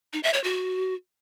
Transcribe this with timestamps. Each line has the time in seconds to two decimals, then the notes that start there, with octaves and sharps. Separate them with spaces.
0.13 D#4
0.23 E5
0.34 C#5
0.44 F#4